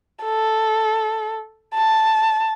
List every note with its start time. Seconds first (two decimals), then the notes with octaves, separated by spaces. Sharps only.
0.24 A4
1.75 A5